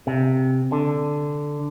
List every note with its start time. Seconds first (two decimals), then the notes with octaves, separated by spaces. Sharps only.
0.07 C3
0.72 D3